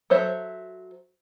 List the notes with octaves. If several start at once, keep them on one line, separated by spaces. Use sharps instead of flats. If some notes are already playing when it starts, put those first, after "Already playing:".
F#3 A4 C5 C#5 E5